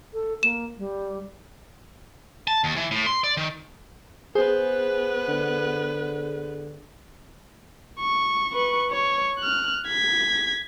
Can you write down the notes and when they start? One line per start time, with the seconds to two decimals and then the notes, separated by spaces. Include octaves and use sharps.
0.13 A4
0.43 A#3 E7
0.78 G3
2.48 A5
2.64 D#2
2.76 E3
2.91 A2
3.06 C6
3.24 D5
3.37 D#3
4.35 B3 G#4 B4 C5
5.28 D3
8.00 C#6
8.53 B4 C#6
8.91 C#5
9.39 F6 F#6
9.88 G#6 B6